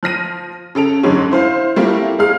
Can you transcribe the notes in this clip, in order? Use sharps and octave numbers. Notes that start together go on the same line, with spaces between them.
F3 F6 A#6 D#7
C#3 A4 D7 F7
F2 G#2 D3 F#3 G#3 C#4
E4 C5 F5
G3 A3 A#3 C4 E4 F4
G#3 G#4 F5 F6